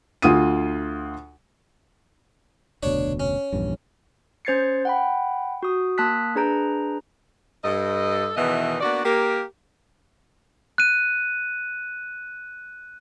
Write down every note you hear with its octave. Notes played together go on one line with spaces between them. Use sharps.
D2 F4 D#6 D#7
F1 D2 B2 D4 C#5
C#4
A#1 E2 G2
C#4 C5 G#6 A6 C7 C#7
F#5 G5 B5
F#4 D#6
A#3 A5 D#6 F#6 B6
D4 G#4 B4 A#5 G6 D7
G2 A4 D#5
E2 B2 D#3 E3 D#5 E5
A#3 B3 D4 F#4 D5
A#3 G4 A#4
F#6 D#7